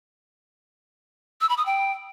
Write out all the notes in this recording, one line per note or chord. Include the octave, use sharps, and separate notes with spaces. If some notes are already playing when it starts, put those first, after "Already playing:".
E6
B5
D#6
G5